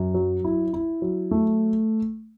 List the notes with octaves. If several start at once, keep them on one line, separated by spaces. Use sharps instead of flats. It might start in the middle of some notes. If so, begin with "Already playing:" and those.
Already playing: F#2
F#3
E4
E4
F#3
A3